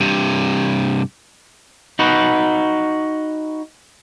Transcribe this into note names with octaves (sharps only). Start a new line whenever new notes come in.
G2 C3
D#4 F#4 B4